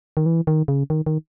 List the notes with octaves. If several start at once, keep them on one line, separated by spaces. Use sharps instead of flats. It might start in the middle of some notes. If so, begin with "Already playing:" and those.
D#3
E3
D#3
C#3
D#3
D#3